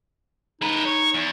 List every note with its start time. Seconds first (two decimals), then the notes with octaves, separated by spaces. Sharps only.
0.62 G#3 D#4 B4
0.85 C#5
1.14 E2